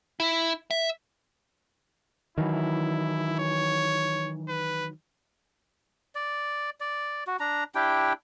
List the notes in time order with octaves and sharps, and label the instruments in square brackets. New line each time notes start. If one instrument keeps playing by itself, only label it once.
[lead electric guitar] E4
E5
[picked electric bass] D#3 E3 F#3 [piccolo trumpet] E4
[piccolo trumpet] C#5
B4
[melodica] D5
D5
F#4
D4 A#5
D4 E4 G4 G5